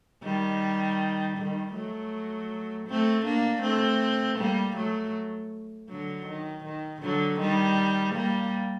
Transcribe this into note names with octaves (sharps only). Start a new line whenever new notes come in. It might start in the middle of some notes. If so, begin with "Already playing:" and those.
D#3 G3
D#3 G3
F#3 A3
A3 C4
A#3 D4
A3 C4
G3 A#3
F#3 A3
D3 F#3
D#3
D#3
D3 F#3
D#3 G3
G3 A#3